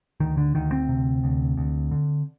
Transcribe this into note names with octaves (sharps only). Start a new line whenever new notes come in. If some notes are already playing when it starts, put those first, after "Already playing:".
D2 D#3
D3
D2 D#3
C4
C3
D2
D2
D3